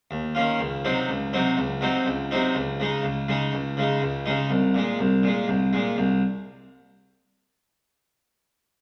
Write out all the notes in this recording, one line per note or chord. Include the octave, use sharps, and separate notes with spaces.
D#2
D#3 A#3 C#4 F4
C#2
C3 F#3 C4 D#4
C#2
C3 F#3 C4 D#4
C#2
C3 F#3 C4 D#4
C#2
C3 F#3 C4 D#4
C#2
C#3 G#3 D#4
C#2
C#3 G#3 D#4
C#2
C#3 G#3 D#4
C#2
C#3 G#3 D#4
C2
A#2 G#3
C2
A#2 G#3
C2
A#2 G#3
C2